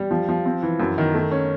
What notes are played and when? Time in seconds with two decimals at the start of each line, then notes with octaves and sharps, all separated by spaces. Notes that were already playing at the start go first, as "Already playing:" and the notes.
Already playing: G3
0.11 F3
0.29 F3
0.46 C4
0.63 E3
0.80 F#2
0.98 D#3
1.14 A3
1.31 C#4